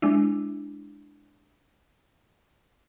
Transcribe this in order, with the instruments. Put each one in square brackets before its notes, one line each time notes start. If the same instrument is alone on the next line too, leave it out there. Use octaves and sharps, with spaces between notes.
[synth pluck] G#3 D4 E4